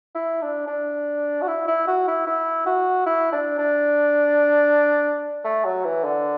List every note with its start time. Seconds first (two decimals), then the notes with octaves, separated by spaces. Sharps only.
0.15 E4
0.42 D4
0.68 D4
1.42 F#4
1.48 E4
1.68 E4
1.88 F#4
2.08 E4
2.27 E4
2.67 F#4
3.06 E4
3.33 D4
3.59 D4
5.44 A3
5.65 F#3
5.85 E3
6.04 D3